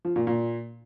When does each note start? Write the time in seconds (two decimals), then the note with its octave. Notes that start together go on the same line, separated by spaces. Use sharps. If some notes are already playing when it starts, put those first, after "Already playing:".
0.05 F3
0.16 A#2
0.27 A#2